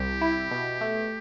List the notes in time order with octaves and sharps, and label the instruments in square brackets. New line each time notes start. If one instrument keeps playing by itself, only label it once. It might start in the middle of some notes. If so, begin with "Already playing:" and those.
Already playing: [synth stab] C2 [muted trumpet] G4
[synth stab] E4
B2
A3